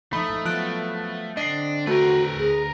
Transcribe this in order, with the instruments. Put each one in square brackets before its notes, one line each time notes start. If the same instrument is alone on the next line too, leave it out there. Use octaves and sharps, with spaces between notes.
[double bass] F3 D#4 [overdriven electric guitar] A3 [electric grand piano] B5
[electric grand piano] F3 F#6 D7 [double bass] F#3 B3
[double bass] D3 C4 [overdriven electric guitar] D4 [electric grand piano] D#5 C7
[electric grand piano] A3 [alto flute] F#4 [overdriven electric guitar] A#4 B4
[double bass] D2 [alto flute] G#4